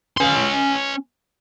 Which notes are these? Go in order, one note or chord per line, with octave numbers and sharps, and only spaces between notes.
C#4 C6